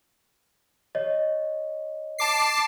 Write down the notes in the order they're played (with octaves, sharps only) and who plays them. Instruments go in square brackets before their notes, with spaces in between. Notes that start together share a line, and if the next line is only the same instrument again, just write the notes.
[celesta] C#5 D#5
[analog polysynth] A5 D6 C7